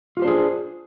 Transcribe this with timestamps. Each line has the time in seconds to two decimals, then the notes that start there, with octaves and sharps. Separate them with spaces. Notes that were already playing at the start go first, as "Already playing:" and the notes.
0.17 F4
0.20 G4
0.22 C5
0.25 D4
0.27 G#4